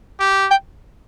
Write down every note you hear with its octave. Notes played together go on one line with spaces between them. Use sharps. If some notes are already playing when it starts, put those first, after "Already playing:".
G4
G5